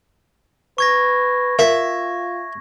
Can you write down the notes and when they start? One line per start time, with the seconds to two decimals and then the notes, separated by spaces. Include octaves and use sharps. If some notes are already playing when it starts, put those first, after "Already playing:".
0.78 B4 C#6 G#6 A#6
1.59 F4 A#4 E5